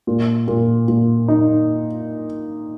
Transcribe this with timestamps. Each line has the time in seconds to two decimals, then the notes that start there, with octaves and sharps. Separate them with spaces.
0.07 A#2
0.48 A#2
0.88 A#2
1.28 D#4